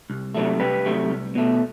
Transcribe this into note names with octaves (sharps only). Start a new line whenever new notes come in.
C2
C3 F#3 A3
C2 G4 B4
C3 F#3 A3
C2
B2 A3